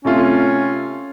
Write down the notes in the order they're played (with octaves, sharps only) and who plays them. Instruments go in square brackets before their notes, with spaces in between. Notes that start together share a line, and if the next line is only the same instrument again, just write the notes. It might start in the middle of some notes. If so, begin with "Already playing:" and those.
[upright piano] C3 A3 F4 [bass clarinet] C#4